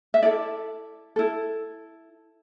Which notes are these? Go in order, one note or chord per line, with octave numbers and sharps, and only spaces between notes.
E5
E4 A4 D5
E4 A4